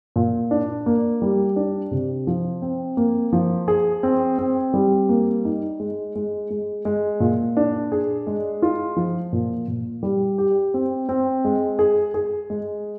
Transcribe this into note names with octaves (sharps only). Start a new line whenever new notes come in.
A#2
D4
A#3
G3
D4
C3
F3
C4
A#3
F3
G#4
C4
C4
G3
A#3
D#4
G#3
G#3
G#3
G#3
A#2
D4
G#4
G#3
F4
F3
A#2
A#2
G3
G4
C4
C4
G#3
G#4
G#4
G#3